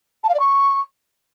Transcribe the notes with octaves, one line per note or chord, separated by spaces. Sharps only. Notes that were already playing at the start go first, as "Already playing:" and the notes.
A5
F5
D5
C#6